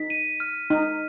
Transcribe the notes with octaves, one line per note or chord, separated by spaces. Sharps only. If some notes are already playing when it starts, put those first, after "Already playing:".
Already playing: D#4 B6
D#7
F6
D#4 F6